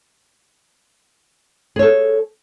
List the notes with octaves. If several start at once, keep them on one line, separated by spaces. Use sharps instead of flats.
G#4 A4 C#5